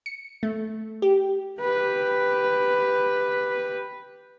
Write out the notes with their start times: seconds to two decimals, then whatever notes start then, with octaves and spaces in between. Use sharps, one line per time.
0.06 C#7
0.43 A3
1.02 G4
1.60 G4 B4